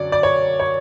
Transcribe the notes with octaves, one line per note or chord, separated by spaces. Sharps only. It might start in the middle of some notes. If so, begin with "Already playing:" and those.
Already playing: F#2 D3 F#3 C#5 D5
D5
C#5
C#5